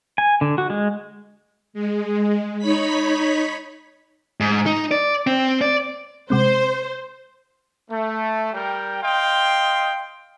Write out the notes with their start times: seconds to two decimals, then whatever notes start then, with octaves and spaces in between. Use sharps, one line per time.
0.18 G#5
0.41 D3
0.58 F#4
0.70 G#3
1.73 G#3
2.58 D#4 C#5 B5 B6
4.40 G#2
4.66 D#4
4.91 D5
5.27 C4
5.61 D5
6.30 C3 G#3 C4 C5
7.91 A3
8.53 G3 A#4 G5
9.02 D#5 F5 G5 C6